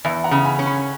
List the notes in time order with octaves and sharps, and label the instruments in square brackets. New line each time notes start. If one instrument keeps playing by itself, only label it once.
[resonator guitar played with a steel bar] E2 [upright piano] E5 G#5
[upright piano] F#5 A#5
[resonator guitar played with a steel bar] C#3
[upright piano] G#5 B5
[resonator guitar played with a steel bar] C#4
[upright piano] G#5 B5